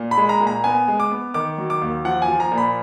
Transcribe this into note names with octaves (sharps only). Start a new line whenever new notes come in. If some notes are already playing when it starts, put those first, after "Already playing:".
Already playing: A#2
B5
G#3
A#5
A#2
A#5
B3 G#5
G#3
D6
B3
D#3 D6
F#3
D6
D#2
F3 F#5
G#5
F3
A#5
A#2
B5